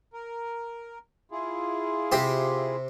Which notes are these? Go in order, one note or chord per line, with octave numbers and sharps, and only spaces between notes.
A#4
E4 F4 G#4
C3 G4 C5